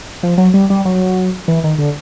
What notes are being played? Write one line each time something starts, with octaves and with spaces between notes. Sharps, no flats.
F3
F#3
G3
G3
F#3
E3
D#3
D3